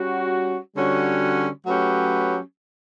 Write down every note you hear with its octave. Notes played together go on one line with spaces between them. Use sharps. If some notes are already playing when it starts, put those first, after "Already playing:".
Already playing: G3 C#4 F#4
D3 G3 C#4 F#4 C#5
F#3 A3 C#4 G4 B4